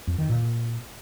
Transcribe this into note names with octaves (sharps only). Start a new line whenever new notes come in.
F2
D#3
A#2